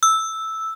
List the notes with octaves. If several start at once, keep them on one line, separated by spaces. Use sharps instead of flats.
E6